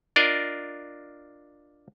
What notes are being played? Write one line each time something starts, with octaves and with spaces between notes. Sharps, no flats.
D4 F4 A#4 D5 D#5